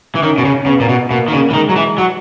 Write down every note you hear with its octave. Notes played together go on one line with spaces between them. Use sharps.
E3
D#3 C#4
B2
C#3
C#3 B3
A#2
B2
B2 A#3
D#3
C#3
E3
D#3 G#3
F#3
E3
F#3